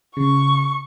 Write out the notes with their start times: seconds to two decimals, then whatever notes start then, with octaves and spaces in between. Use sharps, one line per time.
0.17 C#3 C#6